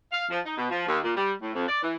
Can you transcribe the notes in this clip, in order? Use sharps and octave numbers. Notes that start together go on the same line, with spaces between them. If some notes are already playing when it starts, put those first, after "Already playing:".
F5
F3
D#4
B2
F3
D#2
A#2
G3
A2
F2
D5
E3